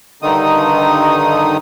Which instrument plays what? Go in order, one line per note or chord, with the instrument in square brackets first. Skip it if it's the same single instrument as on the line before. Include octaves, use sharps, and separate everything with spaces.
[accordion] G2 D3 D#3 D#4 D#6